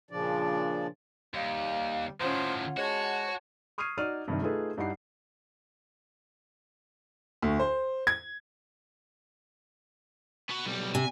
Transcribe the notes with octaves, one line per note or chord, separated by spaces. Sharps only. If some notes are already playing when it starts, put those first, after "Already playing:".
A#2 C#3 F3 D4 D5
D#2 G3 F5
A2 D#3 C#4 F4 C5 F#5
G#3 F#4 C#5 A5
C#6 D#6 F6 G#6 C7 D#7
D#4 F#4 D5 F6 D#7
G2 C3 D#3
A3 D#4 F4 G#4 A4 B4
G2 D#4 E4 G4 F#5 C7
D2
C5
G#6
B3 F#4
B1 G3
C3 G#5